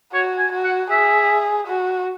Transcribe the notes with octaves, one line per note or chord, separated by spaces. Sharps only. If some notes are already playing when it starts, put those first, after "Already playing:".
F#4 C#5
G#5
F#4
F#5
G#4 E5
F#4